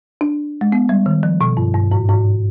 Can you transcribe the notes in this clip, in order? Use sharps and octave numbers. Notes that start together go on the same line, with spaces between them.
D4
G#3
B3
G3
D#3
F3
B2
G2
G2
G#2
G#2